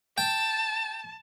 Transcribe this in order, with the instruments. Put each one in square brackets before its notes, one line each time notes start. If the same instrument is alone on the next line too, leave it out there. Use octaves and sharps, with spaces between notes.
[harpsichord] G5 [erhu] A5